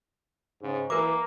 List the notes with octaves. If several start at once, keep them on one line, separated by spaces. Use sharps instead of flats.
G#2 C#3
E3 A#3 A#4 D6